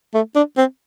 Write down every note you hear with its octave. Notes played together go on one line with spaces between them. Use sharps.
A3
D4
C4